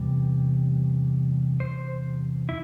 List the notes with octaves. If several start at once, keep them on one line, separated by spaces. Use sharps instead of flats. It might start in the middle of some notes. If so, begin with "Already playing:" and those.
Already playing: E2 C3 G3
C5
E4